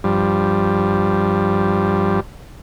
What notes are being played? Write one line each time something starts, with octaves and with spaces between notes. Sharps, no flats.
G2 F3 G3